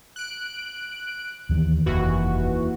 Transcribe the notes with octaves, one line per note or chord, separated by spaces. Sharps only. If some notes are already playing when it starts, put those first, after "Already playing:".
F#6 D7
D#2 D#3 E3
F1 D#2 E3 F#4